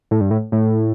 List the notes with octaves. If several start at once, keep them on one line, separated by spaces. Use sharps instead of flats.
A2
G2
A2
A2